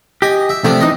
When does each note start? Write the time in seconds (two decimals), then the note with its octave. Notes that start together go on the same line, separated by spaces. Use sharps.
0.22 G4 D#5 G#5
0.49 E5
0.64 C3 F3 A3 C4 D4
0.81 E3 D4 D#4 D#5